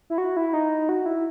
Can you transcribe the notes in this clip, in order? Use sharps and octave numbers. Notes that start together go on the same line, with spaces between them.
E4
F#4
E4
D#4
F#4
E4